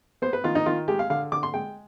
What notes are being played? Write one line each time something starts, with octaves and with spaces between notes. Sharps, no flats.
B3 C5
B4
D#3 F4
D#4
D#3 F4
G#3 G4
F5
D3 F5
D3 D6
C6
G#3 G5